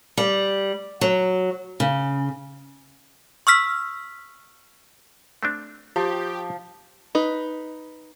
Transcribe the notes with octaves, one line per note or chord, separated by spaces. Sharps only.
G3
F#3
C#3
C#6 E6 F6 B6
A3 C4 D4
F3 G4
D#4 B4